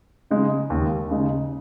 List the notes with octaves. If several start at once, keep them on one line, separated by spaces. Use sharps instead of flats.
C#3 G#3 D#4
D#2
C#3 G#3 D#4